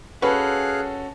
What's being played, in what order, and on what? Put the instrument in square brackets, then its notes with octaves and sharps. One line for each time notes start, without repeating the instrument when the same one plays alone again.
[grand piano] C#4 F#4 A4 [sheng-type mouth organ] G#4 F5 F#6 [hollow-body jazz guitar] B4